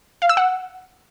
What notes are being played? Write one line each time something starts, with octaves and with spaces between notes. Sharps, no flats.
F5
E6
F#5